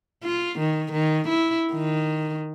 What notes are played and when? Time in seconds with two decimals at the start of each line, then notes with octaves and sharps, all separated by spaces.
0.23 F4
0.59 D#3
0.92 D#3
1.28 E4
1.73 D#3